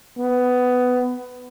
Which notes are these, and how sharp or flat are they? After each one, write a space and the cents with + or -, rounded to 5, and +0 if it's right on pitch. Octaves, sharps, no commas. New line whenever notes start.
B3 +15